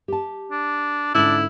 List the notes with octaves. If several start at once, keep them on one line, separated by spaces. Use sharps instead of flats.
G4 A5
D4
G#2 D3 C#4 D4 E4